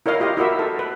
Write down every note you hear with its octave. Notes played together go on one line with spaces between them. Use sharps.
E4 A#4 C#5 D#5 F5
F4 G4 D#5 F5
E4 F#4 A#4 E5
A4
B4